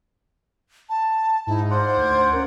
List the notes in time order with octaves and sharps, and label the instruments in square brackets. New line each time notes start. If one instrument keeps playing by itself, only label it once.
[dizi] A5
[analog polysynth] G#2 D#4 [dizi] E4
[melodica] F4 D5 F#5 [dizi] C5
[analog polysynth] D2 G#6 D7
C#4 A#4